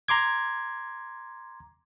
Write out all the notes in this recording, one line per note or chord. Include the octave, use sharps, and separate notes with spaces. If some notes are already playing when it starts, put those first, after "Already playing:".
A#5 C6 D6 G#6